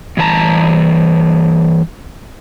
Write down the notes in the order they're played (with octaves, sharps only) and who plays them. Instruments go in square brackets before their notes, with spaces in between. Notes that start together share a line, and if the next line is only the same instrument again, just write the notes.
[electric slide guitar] G2 E3 F#4 A5 A#5